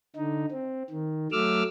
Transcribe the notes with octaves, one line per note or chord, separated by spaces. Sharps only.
D3 D#4
C4
D#3
F#3 A3 D6 E6 F6